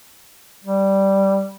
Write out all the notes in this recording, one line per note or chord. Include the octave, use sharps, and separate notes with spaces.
G3